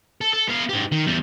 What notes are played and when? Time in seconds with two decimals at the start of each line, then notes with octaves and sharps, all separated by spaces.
0.21 A4
0.33 A4
0.49 B3 F5
0.69 G#2 G4
0.92 D#3
1.06 E2 G3